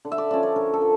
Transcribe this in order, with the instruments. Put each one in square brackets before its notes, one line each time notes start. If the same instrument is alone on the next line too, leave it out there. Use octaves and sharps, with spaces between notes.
[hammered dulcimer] D3
E5
D5
F3 C#4 D5
C#5
D3 A#4
A4
F3